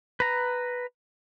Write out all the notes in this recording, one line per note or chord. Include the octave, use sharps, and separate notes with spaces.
B4 A#5